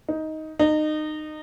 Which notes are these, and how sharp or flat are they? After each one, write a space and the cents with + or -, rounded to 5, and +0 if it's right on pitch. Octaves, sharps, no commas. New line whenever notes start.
D#4 +10
D#4 -25